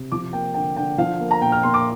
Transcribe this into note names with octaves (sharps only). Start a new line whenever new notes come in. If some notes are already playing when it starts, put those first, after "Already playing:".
Already playing: C3
F3 D6
A#3 G5
D3 G5
D3 G5
F3 F5
A#3
A#5
A#2 G5
F6
A#2 C6
D6